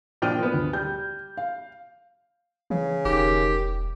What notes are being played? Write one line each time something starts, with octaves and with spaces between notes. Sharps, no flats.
A#2 F3 D4 G5 F6 D#7
F3 B3
D2
G3 G6
F5
C#3 E3
E1 D#3 G4